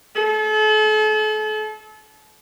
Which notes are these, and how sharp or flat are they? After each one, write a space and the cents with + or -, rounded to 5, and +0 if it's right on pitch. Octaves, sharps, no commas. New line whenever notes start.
A4 -40